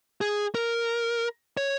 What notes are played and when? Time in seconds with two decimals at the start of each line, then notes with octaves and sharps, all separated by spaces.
0.21 G#4
0.55 A#4
1.57 C#5